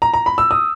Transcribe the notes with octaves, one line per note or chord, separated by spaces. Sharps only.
A#5
A#5
B5
E6
D#6